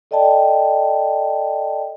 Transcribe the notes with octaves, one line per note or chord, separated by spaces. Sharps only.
A4 D5 D#5 G5 A5